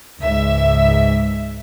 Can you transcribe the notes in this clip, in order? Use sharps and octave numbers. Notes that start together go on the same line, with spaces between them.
C#2 G#2 E5